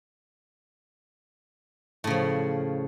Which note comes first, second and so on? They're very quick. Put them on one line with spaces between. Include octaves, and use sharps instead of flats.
A2 C#3 F3